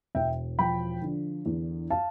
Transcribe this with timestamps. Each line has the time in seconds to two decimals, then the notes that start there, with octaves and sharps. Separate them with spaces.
0.15 E1 E5 G5
0.59 F3 G5 B5
1.02 D3
1.46 E2
1.90 F5 A5